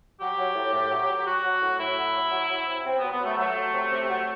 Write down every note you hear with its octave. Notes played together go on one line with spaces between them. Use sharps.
F#3 G4
F#3
A2
A2
F#3
F#3
F#3 F#4
F#3
A2
A2 E4
F#3
F#3
F#3
F#3
C3
C3 C4
F#3 B3
B3
F#3 A3
F#3 A3
F#3
C3
C3
F#3